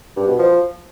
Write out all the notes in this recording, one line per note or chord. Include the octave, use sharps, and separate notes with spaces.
G2
B2
F3